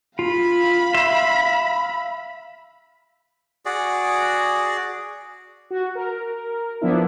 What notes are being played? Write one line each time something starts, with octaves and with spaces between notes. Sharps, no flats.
F4 F5 B5
E5 C6
F#4 G#4 D5
F#4
A#4
F3 B3 D4 E4